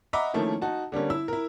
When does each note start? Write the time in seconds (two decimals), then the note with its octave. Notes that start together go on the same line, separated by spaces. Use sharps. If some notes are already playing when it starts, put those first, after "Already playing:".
0.13 D#5 E5 F#5 A#5 B5 D6
0.34 D#3 F3 A3 A#3 C#4 E4
0.62 D#4 F#4 A5
0.92 D3 G3 A#3 C#4
1.10 E4 E6
1.28 E4 A#4